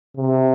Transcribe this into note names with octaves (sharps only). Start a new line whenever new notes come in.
C3